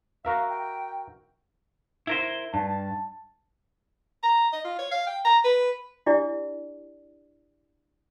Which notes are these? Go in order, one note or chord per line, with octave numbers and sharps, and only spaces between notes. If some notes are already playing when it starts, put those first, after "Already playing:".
F#4 A#4 E5 F5
G5
E4 A#4 C5
G2 A5
A#5
D#5
F4
C#5
F5
G5
A#5
B4
D4 E4 G4 D5